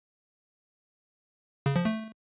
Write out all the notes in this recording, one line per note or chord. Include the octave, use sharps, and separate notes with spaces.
C#3
F3
A3